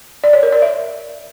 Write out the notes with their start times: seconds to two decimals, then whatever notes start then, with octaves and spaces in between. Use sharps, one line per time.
0.24 D5
0.33 C#5
0.43 A#4
0.52 D5
0.62 E5